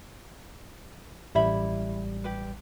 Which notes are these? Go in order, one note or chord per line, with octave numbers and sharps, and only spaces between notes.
A1 G3 E4 E5 B5
G4 B4